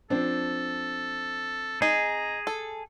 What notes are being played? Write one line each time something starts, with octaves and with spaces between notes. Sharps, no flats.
F3 C4 D4 A4
D#4 G#4 A#5
A4